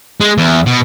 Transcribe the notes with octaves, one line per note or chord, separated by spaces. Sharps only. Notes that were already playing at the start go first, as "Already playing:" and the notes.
G#3
E2
B2